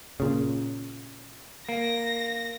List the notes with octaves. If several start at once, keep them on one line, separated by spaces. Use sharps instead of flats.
A#2 C#3
A#3 A#6